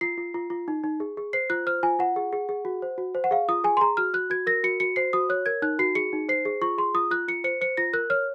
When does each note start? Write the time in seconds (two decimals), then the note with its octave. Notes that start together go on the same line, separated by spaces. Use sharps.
0.01 F4 C7
0.18 F4
0.34 F4
0.50 F4
0.68 D#4
0.84 D#4
1.00 G#4
1.17 G#4
1.33 C5 C7
1.50 F4 F#6
1.67 C5 F6
1.83 F4 G#5
1.99 F4 F#5
2.16 G#4
2.33 G#4
2.49 G#4
2.65 F#4
2.82 C5
2.98 F#4
3.15 C5
3.24 F#5
3.31 G#4 F5
3.49 F4 D#6
3.64 G#4 G#5
3.77 C6
3.81 G#4 A#5
3.97 F#4 F6
4.13 F#4 F#6
4.30 F#4 G#6
4.47 A#4 A#6
4.64 F#4 C#7
4.80 F#4 C#7
4.96 C5 C7
5.13 F#4 D#6
5.29 C#5 F#6
5.46 A#4 G#6
5.62 D#4 F#6
5.79 F#4 C7
5.95 G#4 C#7
6.13 D#4
6.29 C5 C7
6.45 G#4
6.61 F4 C#6
6.78 G#4 C6
6.94 F4 D#6
7.11 F4 F#6
7.28 F4 C#7
7.44 C5 C#7
7.61 C5 C#7
7.77 F4 A#6
7.93 A#4 F#6
8.10 C#5 F6